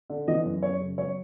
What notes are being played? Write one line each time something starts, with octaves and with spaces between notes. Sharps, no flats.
D3
E3 D#5
F#2
F#2 C#5
C#3
F#3 C#5